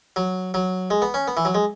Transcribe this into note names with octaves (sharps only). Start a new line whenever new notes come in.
F#3
F#3
G#3
B3
C#4
B3
E3
F#3
G#3